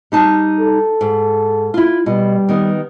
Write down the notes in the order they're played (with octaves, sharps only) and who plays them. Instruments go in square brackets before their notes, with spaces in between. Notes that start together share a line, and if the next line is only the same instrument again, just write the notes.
[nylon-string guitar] G3 D#4 A5
[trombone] A4
[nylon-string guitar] G#2
E4 F4
[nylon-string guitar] B2 [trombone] G3
[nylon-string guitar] D#3 B3